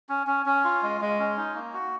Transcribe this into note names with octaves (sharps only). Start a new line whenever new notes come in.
C#4
C#4
C#4
F4
G#3
G#3
C#4
D#4
A#3
F#4